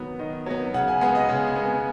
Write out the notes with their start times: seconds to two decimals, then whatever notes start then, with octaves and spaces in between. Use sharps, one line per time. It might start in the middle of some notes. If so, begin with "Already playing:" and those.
Already playing: D#3 F#3 B3
0.19 D#3 D#5
0.46 F#3 B3
0.74 C#3 F#5
0.88 G#5
1.01 G#3 B3 F#5
1.15 D#5
1.29 C#3 G#5
1.47 G#5
1.56 G#3 B3
1.66 G#5